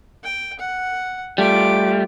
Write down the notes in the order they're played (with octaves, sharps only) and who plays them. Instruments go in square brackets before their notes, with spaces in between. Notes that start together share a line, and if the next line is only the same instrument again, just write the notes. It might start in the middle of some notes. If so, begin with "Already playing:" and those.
[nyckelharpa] G5
F#5
[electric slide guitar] G3 A3 [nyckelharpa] F4 D6